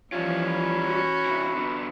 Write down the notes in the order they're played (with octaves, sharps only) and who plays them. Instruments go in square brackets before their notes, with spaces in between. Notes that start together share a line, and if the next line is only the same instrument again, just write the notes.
[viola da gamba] E3 F3 [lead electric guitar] G3 F4 [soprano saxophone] C#4
[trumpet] B5
[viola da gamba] F#4
[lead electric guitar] C3 E3
D3 B3